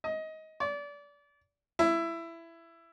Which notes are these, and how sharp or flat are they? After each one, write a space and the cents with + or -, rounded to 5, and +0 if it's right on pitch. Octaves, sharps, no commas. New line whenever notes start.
D#5 +20
D5 -30
E4 +15